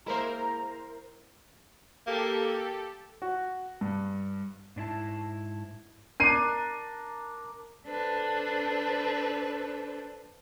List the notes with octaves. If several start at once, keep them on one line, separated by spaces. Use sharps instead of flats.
G#3 A#3 E4 A#4 C5 A#5
A#3 G4 A4
F#4
G2
G#2 D4 E4 A5
D4 A#4 C7 D#7
D4 A4 B4 C5